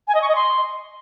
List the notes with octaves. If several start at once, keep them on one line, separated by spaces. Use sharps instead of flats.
G#5
D#5
C#6
D#5
C6